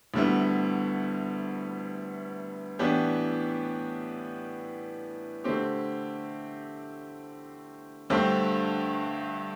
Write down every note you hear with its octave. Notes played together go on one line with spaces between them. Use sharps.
D2 D3 G3 B3 E4
A2 E3 B3 D4 G4
D3 A3 C4 G4
G2 D3 A3 C4 G4